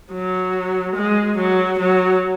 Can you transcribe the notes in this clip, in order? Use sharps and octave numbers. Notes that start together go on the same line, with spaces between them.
F#3
G#3
F#3
F#3